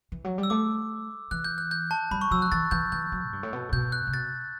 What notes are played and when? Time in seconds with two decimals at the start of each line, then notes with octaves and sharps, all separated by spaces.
0.12 E3
0.24 F#3
0.38 G3
0.43 E6
0.50 A3 D6
1.31 E3 F#6
1.44 G6
1.58 F#6
1.71 G6
1.91 A5
2.11 G3 B5
2.21 C#6
2.31 F#3 E6
2.42 F#6
2.52 E3 A6
2.71 E3 G6
2.92 E3 G6
3.12 F#3
3.25 A2
3.33 G2
3.43 A2
3.53 B2
3.69 A2
3.73 B2 G6
3.92 F#6
4.07 C#3
4.14 B2 A6